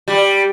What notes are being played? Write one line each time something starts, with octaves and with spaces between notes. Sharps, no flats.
G3